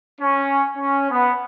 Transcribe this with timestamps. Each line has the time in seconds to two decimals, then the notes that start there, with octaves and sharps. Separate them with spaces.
0.21 C#4
0.77 C#4
1.11 B3